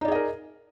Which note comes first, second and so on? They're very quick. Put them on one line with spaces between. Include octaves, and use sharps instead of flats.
D#4 D5 G#4 D#5 A#4